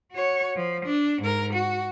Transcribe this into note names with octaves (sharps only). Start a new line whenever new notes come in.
F#4 C#5
F3
D4
G#2 A#4
F#4